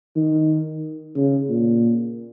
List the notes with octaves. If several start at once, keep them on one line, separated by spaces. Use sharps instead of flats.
D#3
C#3
A#2